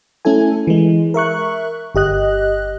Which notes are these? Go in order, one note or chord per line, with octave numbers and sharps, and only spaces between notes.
A3 C#4 E4 A4 G#5
E3 G#3
A#4 E5 C#6 F#6
G1 G4 D#5 F#6